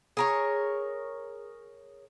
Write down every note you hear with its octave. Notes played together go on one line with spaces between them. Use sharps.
G#4 A#4 C#5